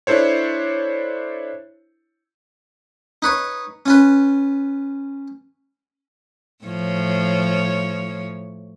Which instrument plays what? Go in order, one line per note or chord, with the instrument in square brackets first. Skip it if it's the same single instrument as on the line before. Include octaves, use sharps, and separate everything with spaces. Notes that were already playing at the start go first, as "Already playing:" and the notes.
[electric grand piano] D4 E4 A4 C5 C#5
[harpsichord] D#4 B4 C#5
C#4 F4 B4
[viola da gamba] A2 F3 C#5